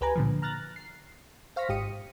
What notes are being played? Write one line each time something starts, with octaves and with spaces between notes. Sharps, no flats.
C#2 G4 B4 G#5 A#5
A#2 D3 F3
A#5 F6 F#6 A6 A#6
C7
C5 F5 C#6 F6 A#6 B6
G#1 G#2 G4 D#6 C#7 D#7